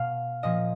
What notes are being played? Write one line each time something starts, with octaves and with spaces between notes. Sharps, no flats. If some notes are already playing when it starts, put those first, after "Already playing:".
Already playing: B2 F5
A#2 F3 D#5